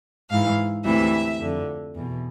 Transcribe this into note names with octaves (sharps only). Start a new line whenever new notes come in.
G#2 E3 F5
D2 C3 E3 E5
F2 D3
E2 B2